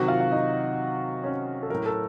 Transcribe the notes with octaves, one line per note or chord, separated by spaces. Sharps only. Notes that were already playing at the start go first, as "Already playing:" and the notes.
Already playing: C3 D#3 F#3 F#4 F#5
F4 F5
F5
D#4 D#5
C#4 C#5
A4
A2 F#3 A#4
A4